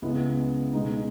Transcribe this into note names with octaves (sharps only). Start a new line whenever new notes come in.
C#2 C#3 G#3 B3 E4
B2 G#3 D#4